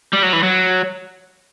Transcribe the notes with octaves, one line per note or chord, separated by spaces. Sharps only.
G3
F#3
E3
F#3